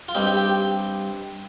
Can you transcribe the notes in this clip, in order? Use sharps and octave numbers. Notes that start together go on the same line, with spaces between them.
F4
G2 G3 C4 D#4 G4
G4
G4